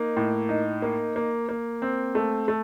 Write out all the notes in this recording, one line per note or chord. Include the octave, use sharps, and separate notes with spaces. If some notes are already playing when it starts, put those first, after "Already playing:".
Already playing: A#3 D#4
A2
D#4
A#3
A#3
A#3
C4
A3
A3